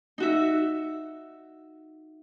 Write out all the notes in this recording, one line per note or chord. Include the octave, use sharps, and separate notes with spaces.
D#4 F#4 E5